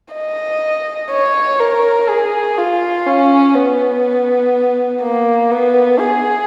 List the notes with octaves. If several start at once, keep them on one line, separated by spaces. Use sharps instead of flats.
D#5
C#5
A#4
G#4
F4
C#4
B3
A#3
B3
G#4